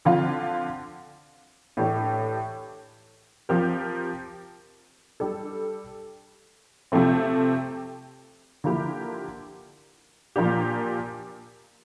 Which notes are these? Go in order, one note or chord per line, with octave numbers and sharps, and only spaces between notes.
D3 F3 C4 F4
A2 E3 A3 D4 G4
F3 C4 G4 A#4
G3 D4 A4
C3 F3 A3 C4
D3 F3 A#3 E4 G4
A#2 F3 A#3 D4 G4